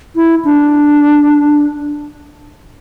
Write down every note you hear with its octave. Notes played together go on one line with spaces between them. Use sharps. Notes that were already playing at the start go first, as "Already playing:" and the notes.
E4
D4